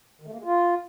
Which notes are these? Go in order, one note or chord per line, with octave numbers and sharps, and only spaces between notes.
D#3
A3
A#3
G#3
F4